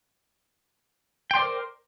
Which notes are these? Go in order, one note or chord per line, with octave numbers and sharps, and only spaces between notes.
A#4 C5 D5 G5 C6